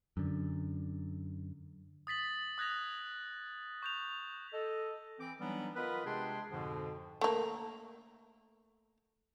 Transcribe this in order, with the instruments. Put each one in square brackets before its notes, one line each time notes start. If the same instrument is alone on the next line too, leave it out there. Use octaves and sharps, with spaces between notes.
[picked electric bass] F#2 D3
[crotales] D#6 A6 B6 F#7
D#6 F#6 G#6 A#6 F7
C#6 G6 F7
[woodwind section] A4 D#5
E3 C4 D6
E3 F#3 G3 B3 D4 D#4
B3 F4 A#4 B4 D#5 B5
C3 G#3 D4 G#4 G5 C6
F2 G#2 B2 D3 F3
[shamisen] A3 A#3